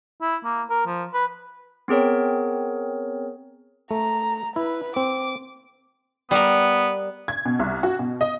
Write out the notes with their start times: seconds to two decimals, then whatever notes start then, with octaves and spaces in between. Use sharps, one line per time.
0.21 E4
0.44 A#3
0.70 A#4
0.86 F3
1.14 B4
1.88 B3 C4 G#4 A#4 C#5
3.91 A3 A#5
4.56 E4 B4
4.96 C4 D6
6.31 G3 B3 A#4
7.28 G#6
7.46 B2
7.59 C2
7.83 F#4
7.99 B2
8.21 D#5